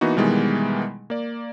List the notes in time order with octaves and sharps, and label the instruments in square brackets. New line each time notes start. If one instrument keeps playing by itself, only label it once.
[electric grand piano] E3 A#3 B3 D#4 F#4
B2 D#3 E3 G3 G#3 B3
A#3 D5